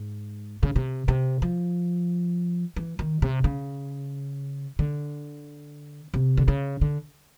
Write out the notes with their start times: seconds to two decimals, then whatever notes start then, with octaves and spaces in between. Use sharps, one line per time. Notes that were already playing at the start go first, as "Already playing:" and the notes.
Already playing: G#2
0.63 C#3
0.76 C3
1.08 C3
1.42 F3
2.76 E3
2.99 D#3
3.22 C3
3.44 C#3
4.79 D3
6.14 C3
6.37 D3
6.48 C#3
6.81 D3